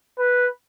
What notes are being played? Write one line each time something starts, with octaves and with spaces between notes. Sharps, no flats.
B4